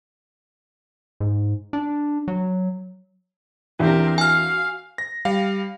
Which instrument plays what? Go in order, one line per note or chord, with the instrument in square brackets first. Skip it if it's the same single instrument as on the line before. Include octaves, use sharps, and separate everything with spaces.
[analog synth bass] G#2
D4
F#3
[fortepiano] E2 D4 [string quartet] C4 G4 A#4
[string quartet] F#4 F5 [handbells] G#5 F6
[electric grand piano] A#6
G3 F5